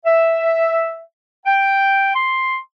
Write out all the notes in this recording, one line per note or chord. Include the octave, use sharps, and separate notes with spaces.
E5
G5
C6